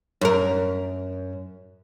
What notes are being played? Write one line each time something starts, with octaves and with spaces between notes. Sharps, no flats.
F#2 A#4